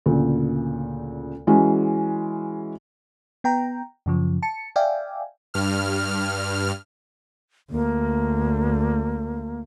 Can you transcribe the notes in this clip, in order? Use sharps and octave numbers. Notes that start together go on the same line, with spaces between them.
D2 A#2 C#3
E3 G#3 C#4 F#4
B3 G5 A#5
F#2 C#3 F3
A5 C#7
D5 E5 F5 G5 G#5
G2 F6
D2 A#3